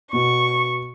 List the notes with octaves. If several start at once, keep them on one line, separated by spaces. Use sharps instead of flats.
B2 C#6